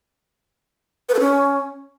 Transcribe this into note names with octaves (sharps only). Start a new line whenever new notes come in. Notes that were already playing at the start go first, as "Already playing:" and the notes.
B4
A4
C#4